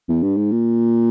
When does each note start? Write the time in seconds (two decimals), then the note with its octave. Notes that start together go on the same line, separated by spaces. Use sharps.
0.09 E2
0.23 G2
0.37 G#2
0.52 A#2